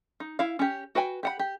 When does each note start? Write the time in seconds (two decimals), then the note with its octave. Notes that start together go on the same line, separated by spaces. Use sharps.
0.20 D#4
0.39 E4 F5
0.59 C#4 G4
0.95 F#4 B4 G5 G#5
1.23 G4 F#5 B5
1.39 G4